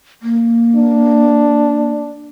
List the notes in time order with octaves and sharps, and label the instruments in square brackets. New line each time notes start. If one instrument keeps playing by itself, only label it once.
[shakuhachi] A#3
[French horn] D4